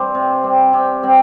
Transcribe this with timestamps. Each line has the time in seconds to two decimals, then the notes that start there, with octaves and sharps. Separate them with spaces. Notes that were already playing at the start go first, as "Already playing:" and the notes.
Already playing: G3 C4 C5 D5
0.15 C3
0.43 G3 C4
0.73 C3 G4
1.03 G3 C4